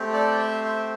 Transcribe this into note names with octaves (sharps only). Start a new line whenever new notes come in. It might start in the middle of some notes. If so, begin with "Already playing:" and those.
Already playing: A3 C4 G4
A4 D5
G5
C5 E5
C5 E5